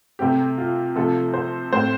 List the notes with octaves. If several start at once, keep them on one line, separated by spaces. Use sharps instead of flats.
C3 A3 C4 G4
F4
C3 F3 A3 A4
C5
A2 A3 C4 C5